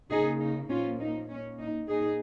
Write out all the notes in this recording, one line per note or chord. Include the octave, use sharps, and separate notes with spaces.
C#3 A#3 D#4 G#4
D#4
A#2 F3 A#3 C#4 F4
D#4
A#2 A#3 C#4
D#4
A#2 A#3 D#4 G#4